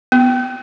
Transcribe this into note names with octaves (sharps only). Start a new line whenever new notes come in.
B3